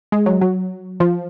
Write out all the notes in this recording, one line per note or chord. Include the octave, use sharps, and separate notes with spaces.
G#3
F#3
F#3
F3